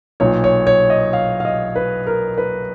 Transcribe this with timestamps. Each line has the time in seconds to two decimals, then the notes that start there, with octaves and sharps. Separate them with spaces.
0.20 B1 A#2 C#5
0.44 C#5
0.67 C#5
0.90 D#5
1.13 F5
1.40 F5
1.45 D#5
1.76 B4
2.07 A#4
2.38 B4